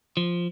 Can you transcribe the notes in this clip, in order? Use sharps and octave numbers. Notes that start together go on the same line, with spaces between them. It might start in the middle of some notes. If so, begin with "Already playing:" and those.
F3